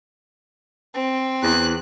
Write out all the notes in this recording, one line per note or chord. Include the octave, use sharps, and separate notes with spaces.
C4
E2 F#6